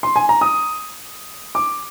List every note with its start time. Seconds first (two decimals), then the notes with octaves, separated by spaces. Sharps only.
0.03 C6
0.16 G#5
0.29 A#5
0.41 D#6
1.55 D6